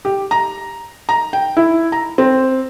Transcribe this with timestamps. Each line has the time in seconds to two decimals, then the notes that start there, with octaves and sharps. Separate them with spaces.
0.05 G4
0.31 A#5
1.09 A#5
1.33 G5
1.57 E4
1.92 A#5
2.18 C4